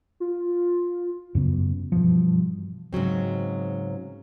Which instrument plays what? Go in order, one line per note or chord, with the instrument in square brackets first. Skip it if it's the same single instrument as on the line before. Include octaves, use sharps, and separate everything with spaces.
[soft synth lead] F4
[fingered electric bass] F#2 C#3 B3
G2 B2 E3 F3
[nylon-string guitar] G#2 C#3 F#3 C4